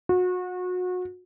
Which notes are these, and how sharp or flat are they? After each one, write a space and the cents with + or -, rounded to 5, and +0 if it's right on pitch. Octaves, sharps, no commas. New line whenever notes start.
F#4 -30